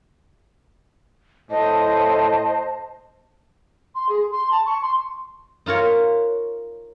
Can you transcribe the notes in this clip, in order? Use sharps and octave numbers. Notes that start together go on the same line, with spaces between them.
A2 C5 D#5 A5
C6
G#4
C6
A5
C#6
C6
D#4 F4 A#4 C#5